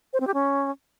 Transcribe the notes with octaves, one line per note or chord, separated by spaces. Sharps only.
C5
C4
G4
C#4